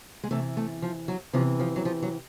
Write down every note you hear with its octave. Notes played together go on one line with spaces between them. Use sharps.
G#3
C3 E3 A3
A3
F3
F#3
C3 E3 F3
F3
F#3
F3
F#3